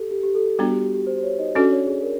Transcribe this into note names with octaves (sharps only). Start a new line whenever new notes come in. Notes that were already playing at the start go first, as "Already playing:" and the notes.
Already playing: G4 A4
G4
G4
A4
G4
G3 B3 D4 F#4
G4
G4
G4
C5
C5
C#5
D#4 D#5
C#4 D4 F#4 A4 D5
C#5
G#4
A#4